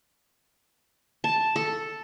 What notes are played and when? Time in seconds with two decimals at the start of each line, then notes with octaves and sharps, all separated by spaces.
1.24 A5
1.56 A4